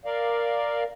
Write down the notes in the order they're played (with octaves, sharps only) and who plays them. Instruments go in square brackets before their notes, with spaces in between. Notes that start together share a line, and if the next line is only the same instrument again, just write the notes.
[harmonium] A#4 D5 F5